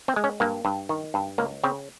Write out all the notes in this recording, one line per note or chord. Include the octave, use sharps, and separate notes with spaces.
C4
G#3
C#4
G2 A#3
G2
D#3
G2
C#2 A#3
C#3 C4